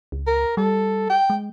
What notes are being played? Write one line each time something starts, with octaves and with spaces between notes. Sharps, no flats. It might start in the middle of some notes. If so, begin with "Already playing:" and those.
C#2
A#4
G3 A4
G5
G#3